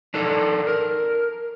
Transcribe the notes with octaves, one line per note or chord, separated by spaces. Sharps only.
D4 D#4 A4
A#4